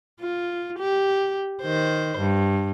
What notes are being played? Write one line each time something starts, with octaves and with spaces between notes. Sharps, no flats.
F4
G4
D#3 C5
G2